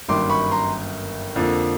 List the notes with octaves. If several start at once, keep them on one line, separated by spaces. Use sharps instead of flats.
G1 F#2 D#3 G3 A#3 C6 D6
B5 C#6
A#5 C6
F2 D3 F3 A#3